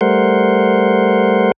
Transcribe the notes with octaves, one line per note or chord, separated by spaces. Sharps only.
G3 A3 A#4 C5 F#5 C6